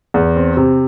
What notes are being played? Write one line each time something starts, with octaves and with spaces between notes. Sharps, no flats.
E2
C4
C3